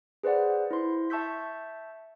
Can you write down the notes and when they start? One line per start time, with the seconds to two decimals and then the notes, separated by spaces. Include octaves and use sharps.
0.23 G#4 B4 C5 D5 F#5
0.71 E4 C5 C6
1.10 E5 A5 C#6 E6 G6 B6